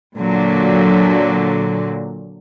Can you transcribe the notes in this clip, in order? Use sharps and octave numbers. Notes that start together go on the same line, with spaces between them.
A#2 D3 F#3